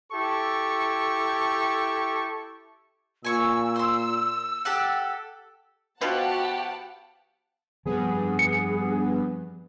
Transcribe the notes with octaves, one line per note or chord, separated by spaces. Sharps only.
E4 G4 A4 C#6
A#2 G#5 C#6 E6
C5 C6
G4 A4 F#5
B2 F3 B3 F#4 G4 F5 F#5 A5
G2 F3 G3 B3 C4 G#4
C#7